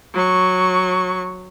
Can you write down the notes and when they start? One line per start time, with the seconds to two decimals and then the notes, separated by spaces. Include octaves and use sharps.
0.14 F#3 C#6